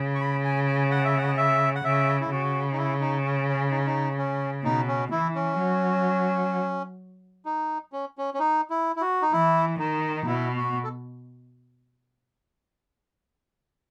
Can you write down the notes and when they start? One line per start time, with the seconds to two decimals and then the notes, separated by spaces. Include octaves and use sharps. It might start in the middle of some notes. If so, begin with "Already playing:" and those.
Already playing: C#3
0.15 C#6
0.20 B5
0.44 G#5
0.67 G#5
0.91 F#5
1.04 E5
1.17 F#5
1.28 D#5
1.37 E5
1.75 F#5
1.84 C#3 E5
2.21 E4
2.31 C#3 F#4
2.73 D#4
2.78 E4
3.01 D#4
3.25 C#4
3.48 C#4
3.71 D#4
3.79 C#4
3.86 D#4
4.18 C#4
4.65 B2 D#4
4.88 C#4
5.11 E3 E4
5.35 C#4
5.59 F#3
7.45 D#4
7.92 C#4
8.18 C#4
8.34 C#4
8.39 D#4
8.70 E4
8.96 E4
9.01 F#4
9.22 D#4
9.33 E3 E4
9.79 D#3 D#4
10.16 D#4
10.26 B2 E4
10.57 F#4
10.84 A4